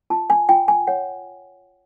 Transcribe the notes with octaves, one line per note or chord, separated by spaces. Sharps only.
F4 A5
G#5
F4 G5
G#5
C#5 F#5